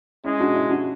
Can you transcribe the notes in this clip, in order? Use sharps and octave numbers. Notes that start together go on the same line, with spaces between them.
G#3 C#4 E4
D4 F#4
C#4 E4
D4 F#4